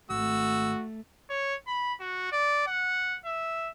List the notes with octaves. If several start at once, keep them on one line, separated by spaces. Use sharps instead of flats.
G#1 A3 F#4 E6
C#5
B5
F#4
D5
F#5
E5